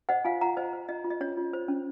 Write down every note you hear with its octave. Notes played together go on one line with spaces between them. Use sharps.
C5 D#5 F#5
F4 F5 G#5
F4 F#5 A#5
C5 D#5
C5
F4 D#5
F4
D#5
C#4 C#5
F4
C5
C#4